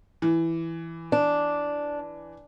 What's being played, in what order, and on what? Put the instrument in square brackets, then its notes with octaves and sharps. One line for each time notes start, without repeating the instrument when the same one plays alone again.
[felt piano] E3
[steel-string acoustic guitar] D4